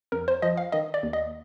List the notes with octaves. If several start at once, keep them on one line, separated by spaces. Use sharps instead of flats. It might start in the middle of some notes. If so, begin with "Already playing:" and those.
F2 A#4
C5
F3 D#5
F5
D#3 D#5
D5
D#2
D#5